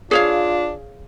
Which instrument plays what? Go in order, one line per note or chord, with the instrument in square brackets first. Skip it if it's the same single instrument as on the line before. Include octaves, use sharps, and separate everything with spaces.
[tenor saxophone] D4 [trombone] F4 [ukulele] G#4 C#5 F5